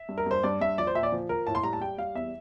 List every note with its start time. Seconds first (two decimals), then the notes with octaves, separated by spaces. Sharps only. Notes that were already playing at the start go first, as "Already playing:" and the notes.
Already playing: E5
0.09 G2
0.18 A#4
0.26 G2 C5
0.43 G2 D5
0.61 G2 E5
0.78 F3 D5
0.87 C5
0.95 A#2 E5
1.03 D5
1.12 F3
1.29 F3 A#4
1.47 A2 A5
1.55 C6
1.63 G3 A#5
1.73 A5
1.81 G3 G5
1.98 G3 F5
2.15 E2 E5